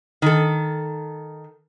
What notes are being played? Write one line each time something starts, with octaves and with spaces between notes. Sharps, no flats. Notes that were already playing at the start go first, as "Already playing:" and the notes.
D#3 A4